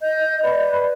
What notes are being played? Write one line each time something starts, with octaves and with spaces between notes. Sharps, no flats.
D#5 G6
B4 D5